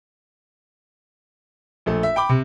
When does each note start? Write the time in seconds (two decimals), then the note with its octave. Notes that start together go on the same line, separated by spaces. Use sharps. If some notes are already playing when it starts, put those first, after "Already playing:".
1.86 A#1 A3
2.03 E5
2.16 G5 B5 D6
2.29 C3